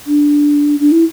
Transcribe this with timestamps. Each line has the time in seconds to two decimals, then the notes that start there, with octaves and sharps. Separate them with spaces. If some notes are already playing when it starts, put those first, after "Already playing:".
0.07 D4
0.80 D4
0.92 E4